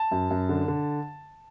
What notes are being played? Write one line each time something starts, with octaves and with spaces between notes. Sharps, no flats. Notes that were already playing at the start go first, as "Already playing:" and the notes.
Already playing: A5
F#2
F#2
D3
D3